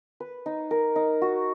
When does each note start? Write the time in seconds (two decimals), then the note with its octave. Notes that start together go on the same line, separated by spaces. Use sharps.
0.20 B4
0.46 D#4
0.71 A#4
0.96 D#4
1.22 F#4